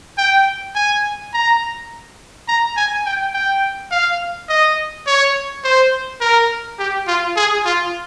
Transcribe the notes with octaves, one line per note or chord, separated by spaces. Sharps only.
G5
G#5
A#5
A#5
G#5
G5
G5
F5
D#5
C#5
C5
A#4
G4
F4
G#4
F4